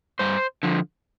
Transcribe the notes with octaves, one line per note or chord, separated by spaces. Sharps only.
G2 C5
D3 F3